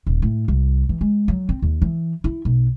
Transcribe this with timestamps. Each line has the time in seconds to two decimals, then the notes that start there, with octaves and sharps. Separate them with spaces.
0.06 D#1
0.22 A2
0.48 C2
0.89 E3
1.01 G#3
1.28 F#3
1.49 C4
1.62 D#2
1.82 E3
2.24 E4
2.45 B1